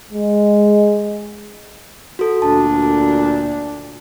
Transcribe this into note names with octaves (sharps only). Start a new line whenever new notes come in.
G#3
F#4 A4
D2 A#2 D4 A5